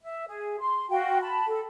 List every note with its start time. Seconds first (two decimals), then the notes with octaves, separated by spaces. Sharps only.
0.02 E5
0.27 G#4
0.61 C6
0.90 F#4 F5 G5
1.21 A5 B5
1.48 A4